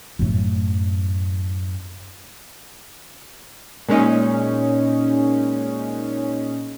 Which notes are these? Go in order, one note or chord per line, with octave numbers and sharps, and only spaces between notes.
F#2 A2
A#2 G#3 C#4 D#4